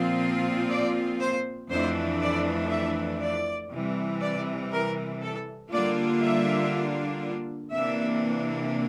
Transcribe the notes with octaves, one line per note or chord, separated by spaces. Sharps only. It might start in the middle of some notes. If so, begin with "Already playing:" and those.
Already playing: A#2 F3 C4 F4
D5
C5
F2 E3 A3 D4 C5
D5
E5
D5
C3 E3 G3
D5
A#4
A4
D3 G3 A#3 D4 F4 D5
E5
C3 E3 A#3 D4 E5